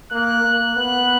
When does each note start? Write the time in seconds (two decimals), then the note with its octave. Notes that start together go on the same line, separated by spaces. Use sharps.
0.12 A#3 F#6
0.44 A#3
0.76 B3 F#6